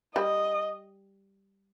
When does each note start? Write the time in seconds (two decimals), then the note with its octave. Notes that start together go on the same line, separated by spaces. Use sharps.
0.16 G3 D#5